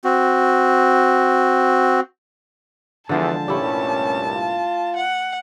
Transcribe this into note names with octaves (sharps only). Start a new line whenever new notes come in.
C4 F#4
E2 D3 F3 G#3 A5
C2 G2 A#2 A3 C#4 E4 G4
F4
F#5